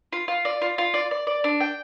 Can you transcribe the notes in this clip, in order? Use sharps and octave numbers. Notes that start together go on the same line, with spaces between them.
F4
F4
D5
F4
F4
D5
D5
D5
D4
G5